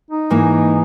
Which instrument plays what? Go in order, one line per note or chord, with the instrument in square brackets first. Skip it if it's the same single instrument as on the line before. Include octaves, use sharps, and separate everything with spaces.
[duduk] D#4
[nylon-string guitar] G#2 E3 A#3